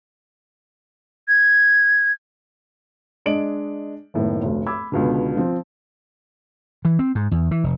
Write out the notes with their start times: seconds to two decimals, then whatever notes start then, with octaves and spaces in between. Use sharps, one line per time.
1.28 G#6
3.26 G#3 D4 D#5 D7 F#7
4.14 F#1 A2 D#3 B3
4.43 F1 D2
4.67 B5 D6 E6 G#6
4.92 C#2 B2 D3
5.37 F3 C4
6.85 E3
6.99 C4
7.15 G#2
7.31 E2
7.51 E3
7.64 F1